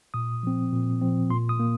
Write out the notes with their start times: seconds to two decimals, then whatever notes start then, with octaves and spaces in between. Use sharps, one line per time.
0.14 A#2 D#6
0.43 F3 C4
0.72 A#2
1.01 F3 C4
1.30 A#2 C6
1.49 D#6
1.60 A#3